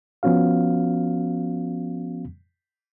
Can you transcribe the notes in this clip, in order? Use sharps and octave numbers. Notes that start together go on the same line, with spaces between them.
F3 B3 C#4 F#4 F5